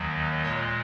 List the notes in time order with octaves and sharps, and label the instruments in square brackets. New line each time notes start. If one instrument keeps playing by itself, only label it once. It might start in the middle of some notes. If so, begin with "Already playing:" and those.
Already playing: [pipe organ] D#2 D#3 F#3
A#2 G#3 C#5